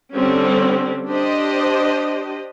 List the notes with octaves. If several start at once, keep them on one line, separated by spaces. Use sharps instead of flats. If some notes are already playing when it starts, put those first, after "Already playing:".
D3 G3 C4 C#4
D4 G4 C5 D#5